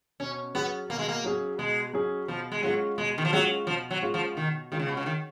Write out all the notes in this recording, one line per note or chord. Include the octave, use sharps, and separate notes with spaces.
B2 C#4
F#3 B3 C#4 G#4
B2 A#3
G#3
A#3
F#3 C#4 G#4
B2 G#3
F#3 C#4 G#4
B2 F3
G#3
F#3 G#3 C#4 F4 G#4
B2 G#3
D#3
F3
F#3 G#3 C#4 F4 G#4
B2 F3
F#3
G#3 C#4 F4 G#4
F3
B2 D#3
D#3 G#3 C#4 F4 G#4
C#3
B2
C#3
D#3